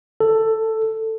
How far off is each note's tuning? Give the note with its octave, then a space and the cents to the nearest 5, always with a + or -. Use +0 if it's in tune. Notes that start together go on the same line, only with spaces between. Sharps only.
A4 +10